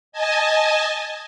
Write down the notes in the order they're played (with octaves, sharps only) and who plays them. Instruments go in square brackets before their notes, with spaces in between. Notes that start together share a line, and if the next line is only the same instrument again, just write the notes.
[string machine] D#5 G#5 A5